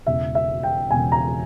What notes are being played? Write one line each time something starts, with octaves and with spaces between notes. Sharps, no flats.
E1 E2 C#3 E5
E5
G5
E1 E2 C#3 G#5
A#5